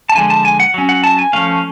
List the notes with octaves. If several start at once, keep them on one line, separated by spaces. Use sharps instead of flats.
A5
D3 F3 G#3 G#5
A5
G#5
F#5
F#3 C#4
F#5
A5
G#5
F3 A3 C#4 F5